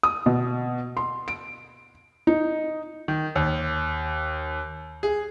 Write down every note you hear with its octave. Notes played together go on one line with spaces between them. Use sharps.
D#6
B2
C6
D7
D#4
D#3
D#2
G#4